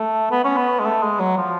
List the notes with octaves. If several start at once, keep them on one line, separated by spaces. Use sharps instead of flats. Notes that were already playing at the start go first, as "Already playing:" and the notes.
Already playing: A3
B3
C#4
B3
G#3
A3
G#3
F#3
F3